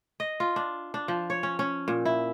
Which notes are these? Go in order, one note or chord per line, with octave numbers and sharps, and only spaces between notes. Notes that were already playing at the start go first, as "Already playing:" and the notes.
D#5
F4
D4
D4
F3
C#5
C#4
C#4
A#2
E4